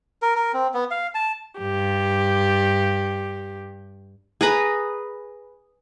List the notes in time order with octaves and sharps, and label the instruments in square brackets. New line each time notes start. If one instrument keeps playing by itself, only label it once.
[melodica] A#4
A#4
C4
B3
F5
A5
[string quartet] G2 G4
[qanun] G#4 B4 A#5 B5